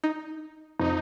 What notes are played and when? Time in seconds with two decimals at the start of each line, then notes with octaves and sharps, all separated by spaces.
0.04 D#4
0.79 F2 D#4